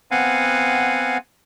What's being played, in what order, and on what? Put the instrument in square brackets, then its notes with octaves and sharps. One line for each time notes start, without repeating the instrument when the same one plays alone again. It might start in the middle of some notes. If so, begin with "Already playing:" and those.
[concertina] B3 C4 F5 F#5 G#5